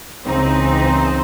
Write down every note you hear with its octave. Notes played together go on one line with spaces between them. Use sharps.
C#2 C#3 E3 C4 D#4
C5